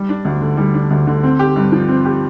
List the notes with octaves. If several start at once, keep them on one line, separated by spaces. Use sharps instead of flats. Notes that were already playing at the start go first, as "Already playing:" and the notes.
Already playing: G3
D4
D2
D3
G3
D4
D2
D3
C4
G4
G2
F3
C4
G4